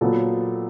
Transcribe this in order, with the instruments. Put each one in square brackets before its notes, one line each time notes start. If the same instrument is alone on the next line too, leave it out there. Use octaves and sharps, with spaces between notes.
[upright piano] A#2 F#3 B3 A4